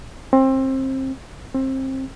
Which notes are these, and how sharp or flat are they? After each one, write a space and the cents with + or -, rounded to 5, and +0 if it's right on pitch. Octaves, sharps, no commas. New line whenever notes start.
C4 +25
C4 +25